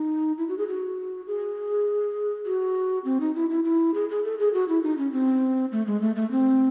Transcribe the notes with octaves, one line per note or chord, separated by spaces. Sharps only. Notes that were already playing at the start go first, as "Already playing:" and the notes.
Already playing: D#4
E4
F#4
G#4
F#4
G#4
F#4
C4
D#4
E4
E4
E4
G#4
G#4
A4
G#4
F#4
E4
D#4
C#4
C4
A3
G#3
A3
A3
C4